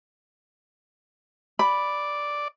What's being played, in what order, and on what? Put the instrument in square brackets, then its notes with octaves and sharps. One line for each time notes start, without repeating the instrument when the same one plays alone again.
[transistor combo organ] D5 [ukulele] B5